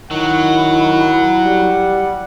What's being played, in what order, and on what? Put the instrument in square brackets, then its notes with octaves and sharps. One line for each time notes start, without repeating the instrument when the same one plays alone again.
[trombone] D#3 [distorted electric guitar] F#3 [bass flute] E4 [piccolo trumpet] F#5
[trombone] G3